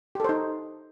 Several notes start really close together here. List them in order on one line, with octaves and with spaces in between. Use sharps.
G4 A4 C5 D#4